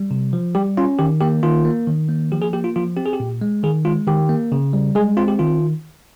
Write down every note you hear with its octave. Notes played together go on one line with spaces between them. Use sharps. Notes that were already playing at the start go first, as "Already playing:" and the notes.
Already playing: G3
C3
F3
G3 G4
C#4 F4
D#3 G4
A#3 G4
D#3 F4
A#3
D#3
A#3
F3 G4
G#4
A#3 G4
F4
F3 F4
C4 G4
G#4
G4
A#2
G#3
D#3 G#4
G#3 F4
D#3 G4
A#3
C#3
G3
G#3 G#4
C4 F4
G4
D#3 F4